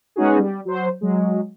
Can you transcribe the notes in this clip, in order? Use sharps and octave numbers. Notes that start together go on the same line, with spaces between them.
G#3 B3 C#4 D#4 F#4 G#4
G3
F#3 C5
F#3 G#3